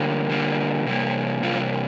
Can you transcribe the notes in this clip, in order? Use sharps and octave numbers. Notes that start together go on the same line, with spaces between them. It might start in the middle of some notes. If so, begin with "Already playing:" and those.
Already playing: D3 G3 A#3
D3 G3 A#3
C3 G3 A#3
C3 G3 A#3 F4